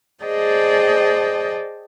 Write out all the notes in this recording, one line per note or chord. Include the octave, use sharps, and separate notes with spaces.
G#4 C5 D5 D#5 G5 A5